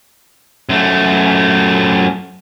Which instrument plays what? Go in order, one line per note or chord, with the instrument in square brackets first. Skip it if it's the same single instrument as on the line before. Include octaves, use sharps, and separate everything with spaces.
[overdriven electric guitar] F#2 A3